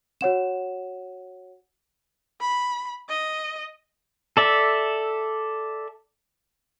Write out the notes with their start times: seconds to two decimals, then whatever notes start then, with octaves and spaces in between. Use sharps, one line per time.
0.21 F#4 C#5 F#5 E7
2.41 B5
3.09 D#5
4.37 A4 D5 E5